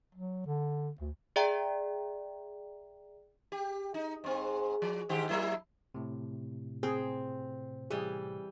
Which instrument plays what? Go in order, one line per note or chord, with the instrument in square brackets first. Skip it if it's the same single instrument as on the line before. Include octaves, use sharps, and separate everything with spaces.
[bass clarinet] F#3
D3
D2
[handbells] G#4 D5 E5 G5 A#5
[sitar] G4
D#4
G#2 C4
F3
G#2 D#3 G4
F#3 A#3 E4
[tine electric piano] A2 C3
[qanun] C4 [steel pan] G#4
[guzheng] E3 G3 [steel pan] G#4